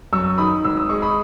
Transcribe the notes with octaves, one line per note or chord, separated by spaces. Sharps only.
F#2 C#6 E6
D#3 B5 D#6
G#1 E6
D#6
G#3 C#6
B5 D#6